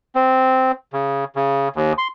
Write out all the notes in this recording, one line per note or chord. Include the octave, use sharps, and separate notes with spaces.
C4
C#3
C#3
D#2
C6